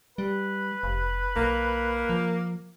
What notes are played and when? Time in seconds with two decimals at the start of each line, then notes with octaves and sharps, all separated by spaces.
0.18 G3 B4
0.83 F1
1.36 B1 A#3
2.10 F3